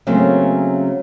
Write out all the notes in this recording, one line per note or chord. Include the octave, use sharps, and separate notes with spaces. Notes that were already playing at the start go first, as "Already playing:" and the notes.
C#3 F#3 A3 A#3 C4 C#4